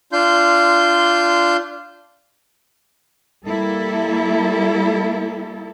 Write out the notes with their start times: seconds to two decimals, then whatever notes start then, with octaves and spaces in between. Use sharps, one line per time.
0.12 D4 F4 C6 G6
3.46 G3 A#3 E4 A4